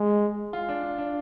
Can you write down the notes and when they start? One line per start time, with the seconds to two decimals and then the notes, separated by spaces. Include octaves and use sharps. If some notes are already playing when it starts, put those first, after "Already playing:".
Already playing: G#3
0.53 F4
0.69 D4
0.83 D4
0.98 D4